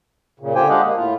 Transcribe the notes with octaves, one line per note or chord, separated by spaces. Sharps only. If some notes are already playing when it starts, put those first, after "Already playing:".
A#2 C#3
D3 F4 G4 C5 G5 G#5
G#3 D4 G4 D#5 F5 F#5
A#3
A2 F4